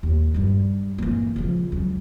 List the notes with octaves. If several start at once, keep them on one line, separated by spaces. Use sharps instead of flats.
D#2
G2 G3
E3 A#3
C#3 F3
C#2 F#3